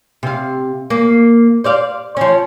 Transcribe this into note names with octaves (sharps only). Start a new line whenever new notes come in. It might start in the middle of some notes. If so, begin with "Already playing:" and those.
C3 F5
A#3
C5 D5 F5
F3 C#4